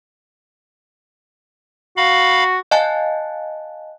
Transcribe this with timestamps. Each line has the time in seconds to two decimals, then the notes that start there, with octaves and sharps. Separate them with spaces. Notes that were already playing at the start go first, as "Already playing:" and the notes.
1.97 F#4 F5 B5
2.71 D#5 F5 G#5 A5 F#6 A6